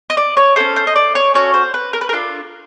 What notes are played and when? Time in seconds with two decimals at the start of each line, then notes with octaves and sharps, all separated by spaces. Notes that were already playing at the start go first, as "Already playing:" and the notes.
0.10 D#5
0.17 D5
0.37 C#5
0.56 C#4 F#4 A4 C5
0.76 C5
0.87 D#5
0.96 D5
1.15 C#5
1.34 C#4 F#4 A4 C#5
1.54 C5
1.74 B4
1.93 A#4
2.01 B4
2.09 A#4
2.13 D4 F4 A4